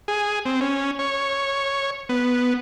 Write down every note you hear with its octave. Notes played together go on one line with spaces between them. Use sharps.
G#4
C4
C#4
C#5
B3